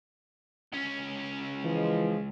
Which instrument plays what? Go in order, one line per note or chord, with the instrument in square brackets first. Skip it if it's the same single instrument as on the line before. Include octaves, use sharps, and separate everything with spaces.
[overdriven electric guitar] C#2 C#4
[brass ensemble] E3 F3 G#3